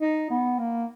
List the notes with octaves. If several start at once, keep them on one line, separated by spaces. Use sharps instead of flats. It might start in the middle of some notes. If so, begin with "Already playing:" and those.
D#4
B3
A#3